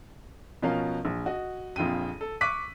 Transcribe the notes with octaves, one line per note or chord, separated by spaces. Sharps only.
B2 F3 C#4 A#4 F5
A#1
F#4 D#5
A#1 F2 F4 G5 D#7
A4
C#6 D6 F#6 B6 D#7